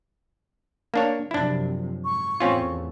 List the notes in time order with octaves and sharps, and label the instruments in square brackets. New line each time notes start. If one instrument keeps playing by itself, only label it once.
[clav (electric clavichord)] A#3 D4 C#5
[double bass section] F#2 C3 F3 [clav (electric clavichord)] D4 E4
[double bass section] G#2 [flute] C#6
[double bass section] E2 A2 A3 [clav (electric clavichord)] C4 C#4 F4